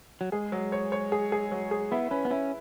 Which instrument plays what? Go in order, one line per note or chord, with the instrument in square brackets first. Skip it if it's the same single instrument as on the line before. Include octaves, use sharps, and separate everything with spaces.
[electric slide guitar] F#3
[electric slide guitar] G#3 [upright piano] G#4
[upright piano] F#3
C#5
C#5
G#4
G#4
F#3
G#4
[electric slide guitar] B3 [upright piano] E4
[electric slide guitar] C#4 [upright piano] B4
[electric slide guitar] B3
[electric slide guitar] C#4 [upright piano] E4